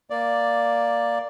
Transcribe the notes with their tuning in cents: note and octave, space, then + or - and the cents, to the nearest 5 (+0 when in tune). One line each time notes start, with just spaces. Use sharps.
A#3 +0 D5 +0